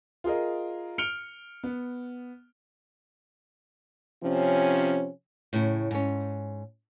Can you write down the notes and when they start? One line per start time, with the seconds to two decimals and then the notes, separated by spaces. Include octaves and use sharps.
0.24 F4 G#4 A#4 D#5
0.98 F6 C#7 D7 F7 G7
1.63 B3
4.24 C3 F3 C#4
5.53 A2 C#3 E4
5.91 G#2 C#4